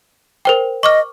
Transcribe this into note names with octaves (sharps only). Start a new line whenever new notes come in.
A#4 C5 G5
D#5 C#6 D6 F6